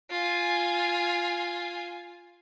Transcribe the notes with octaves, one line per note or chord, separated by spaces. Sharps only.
F4 G#5